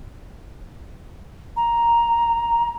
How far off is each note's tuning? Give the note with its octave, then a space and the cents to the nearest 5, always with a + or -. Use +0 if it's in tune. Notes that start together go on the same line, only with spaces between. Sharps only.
A#5 +5